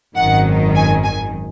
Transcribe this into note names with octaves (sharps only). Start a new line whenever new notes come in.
G#1 F#2 D#3 F#5
G#5
G#5